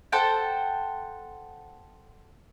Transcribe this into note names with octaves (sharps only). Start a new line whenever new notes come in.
A4 C5 F#5 G5